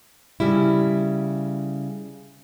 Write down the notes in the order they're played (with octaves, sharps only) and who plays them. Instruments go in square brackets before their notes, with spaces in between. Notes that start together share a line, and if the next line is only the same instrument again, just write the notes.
[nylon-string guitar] C#3 G3 E4